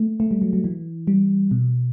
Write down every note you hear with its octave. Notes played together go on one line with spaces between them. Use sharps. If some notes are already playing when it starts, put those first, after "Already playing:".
Already playing: A3
A3
G3
F#3
F#3
E3
G3
B2